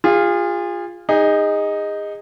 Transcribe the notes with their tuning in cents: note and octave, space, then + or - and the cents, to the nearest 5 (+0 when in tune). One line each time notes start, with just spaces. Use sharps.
F4 +0 G#4 -35
D#4 +0 G#4 -30